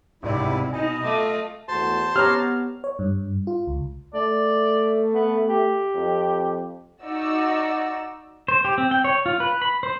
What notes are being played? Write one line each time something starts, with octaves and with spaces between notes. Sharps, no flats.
G#1 C#2 C3 G3 E4 D5
B2 D#4 D#5 G#5
A3 F4 D6 D#7
E2 A3 F#4 C5 A5 C6
B3 G4 C#5 A#5 F6
C#5
G2
F4
C#2
A3 D5
B3
G4
F2
D#4 F#4 D5 E6
C5
G4
C4
G5
C#5
F4
B4
B5
C5